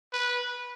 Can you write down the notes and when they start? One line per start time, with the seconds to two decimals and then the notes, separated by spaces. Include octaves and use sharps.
0.13 B4